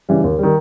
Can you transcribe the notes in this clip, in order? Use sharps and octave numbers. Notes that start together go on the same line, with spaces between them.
C#3 E3 G3
D#2
D#3 G3